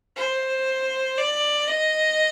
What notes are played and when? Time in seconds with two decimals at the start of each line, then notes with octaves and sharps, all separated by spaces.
0.16 C5
1.18 D5
1.68 D#5